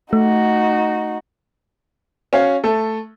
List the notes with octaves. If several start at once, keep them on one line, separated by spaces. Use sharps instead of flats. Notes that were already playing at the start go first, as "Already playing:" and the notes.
A3 D#4 F#4
C#4 F#4 C#5 F5
A3 A4